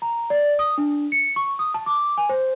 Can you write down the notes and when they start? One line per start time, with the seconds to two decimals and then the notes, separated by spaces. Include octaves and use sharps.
0.02 A#5
0.30 D5
0.59 D#6
0.78 D4
1.12 C#7
1.36 C#6
1.59 D#6
1.74 A5
1.86 D6
2.18 G#5
2.29 C5